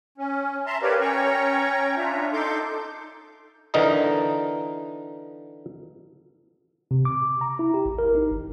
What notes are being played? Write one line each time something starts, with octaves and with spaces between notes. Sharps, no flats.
C#4
E5 A5 A#5 C6
G4 A#4 B4 C#5 D5 F5
C#4 C#5 G5 A#5 C#6
D4 F4 E5 A#5
D#4 A4 C6 D6 G6
D3 E3 D#4 A#4 D#5 A#5
C3
D6
A#5
E4
G4
A1
A#4
D#4
G#1